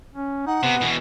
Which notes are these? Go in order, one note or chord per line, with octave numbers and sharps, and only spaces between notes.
C#4
D#4 F#5
C3 B3
B2 E3